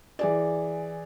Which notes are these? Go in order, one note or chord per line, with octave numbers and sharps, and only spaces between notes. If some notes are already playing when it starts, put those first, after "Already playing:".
E3 G#4 D5